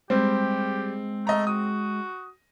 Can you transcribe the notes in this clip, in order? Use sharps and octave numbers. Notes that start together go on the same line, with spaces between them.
G3 G#3 C4 G4
A3 D#5 A#5
F#4 D#6